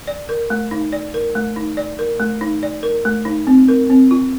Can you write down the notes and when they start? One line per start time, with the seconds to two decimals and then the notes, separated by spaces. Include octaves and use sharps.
0.07 D5
0.29 A#4
0.50 A3
0.71 D#4
0.93 D5
1.14 A#4
1.35 A3
1.56 D#4
1.77 D5
1.99 A#4
2.20 A3
2.41 D#4
2.63 D5
2.83 A#4
3.05 A3
3.25 D#4
3.47 C4
3.68 A#4
3.90 C4
4.11 F4